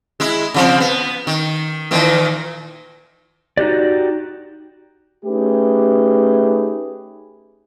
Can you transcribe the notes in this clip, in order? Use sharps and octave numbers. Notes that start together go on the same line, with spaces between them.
G#3 E4
C#3 F3 C4
B3
D#3
A#2 D#3 E3
D#4 F#4 G4 D5
A3 C#4 D#4 G4 G#4 B4